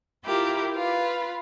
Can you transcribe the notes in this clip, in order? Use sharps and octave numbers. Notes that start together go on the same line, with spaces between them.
E4 F4 G4 A#4
F4 B4